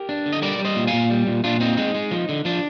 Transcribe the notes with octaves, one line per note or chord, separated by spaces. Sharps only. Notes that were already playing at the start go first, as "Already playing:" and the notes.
Already playing: G4 A#4
D4
D3
D#5
G3 A#4 D5
G3
C5 D#5
A#2
F5 G#5
A#2
G3
A#2
A#2 D4 F4
C4 D#4
G#3 D#4
G#3
F3
D3
F3 D4